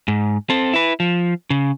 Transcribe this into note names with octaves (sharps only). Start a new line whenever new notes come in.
G#2
C4 A4
E4 B4
F3
C#3